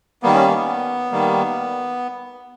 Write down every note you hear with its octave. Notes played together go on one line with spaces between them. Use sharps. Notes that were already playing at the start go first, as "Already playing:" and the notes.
D#3 G3 A#3 B3
C#4
B3
D#3 G3 A#3